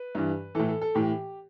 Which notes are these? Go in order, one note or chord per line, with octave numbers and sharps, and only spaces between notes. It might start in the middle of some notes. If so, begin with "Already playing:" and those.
Already playing: B4
G2 E3
A2 E3 A4
A4
A4
A2 E3 G4